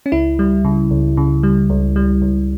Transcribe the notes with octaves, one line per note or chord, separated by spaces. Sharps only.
C#4
C#2 E4
G3
C#3
C#2
C#3
G3
C#2
G3
C#2